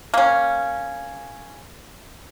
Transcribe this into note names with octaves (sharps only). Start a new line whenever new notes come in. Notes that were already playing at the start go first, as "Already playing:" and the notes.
A#3 C#4